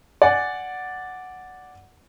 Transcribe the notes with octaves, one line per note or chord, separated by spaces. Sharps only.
D5 F#5 G#5